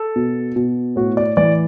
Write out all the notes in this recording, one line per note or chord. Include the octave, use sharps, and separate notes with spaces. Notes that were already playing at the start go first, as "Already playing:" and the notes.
Already playing: A4
B2
B2
A2 F#4
D5
E3 D5